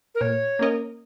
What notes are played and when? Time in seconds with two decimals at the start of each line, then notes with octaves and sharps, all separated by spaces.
0.15 A#4
0.21 A#2 C#5
0.59 A#3 C#4 A#4 D#5